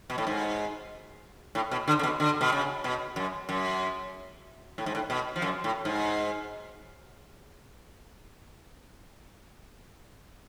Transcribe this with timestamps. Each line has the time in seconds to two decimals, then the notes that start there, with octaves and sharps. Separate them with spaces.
0.10 B2
0.18 A2
0.27 G#2
1.55 A2
1.71 B2
1.88 D3
1.99 C#3
2.03 B2
2.20 D3
2.41 B2
2.52 C#3
2.84 B2
3.16 F#2
3.49 F#2
4.78 A2
4.86 G#2
4.95 A2
5.10 B2
5.36 F3
5.42 F#2
5.64 A2
5.85 G#2